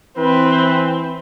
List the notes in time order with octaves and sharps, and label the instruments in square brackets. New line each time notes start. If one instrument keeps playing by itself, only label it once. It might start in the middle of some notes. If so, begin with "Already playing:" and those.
[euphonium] E3 [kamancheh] C4 [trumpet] B4